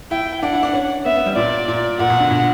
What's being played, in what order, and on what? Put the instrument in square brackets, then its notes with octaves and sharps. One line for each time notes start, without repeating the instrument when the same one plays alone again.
[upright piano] E4 [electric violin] G5
[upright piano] D4 [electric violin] F#5
[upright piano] E4
D4
C#4
[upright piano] B3 [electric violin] E5
[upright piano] B3
G3
[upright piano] A#2 [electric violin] D5
[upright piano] A#2
[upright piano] A#2 [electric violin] F#5
[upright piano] B2
D3
B2